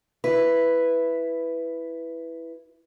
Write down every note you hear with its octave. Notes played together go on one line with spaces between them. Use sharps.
E4 B4